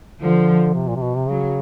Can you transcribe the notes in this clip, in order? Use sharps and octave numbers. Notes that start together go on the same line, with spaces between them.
D3 F3
C3
A#2
C3
B2
C3
C#3 F#3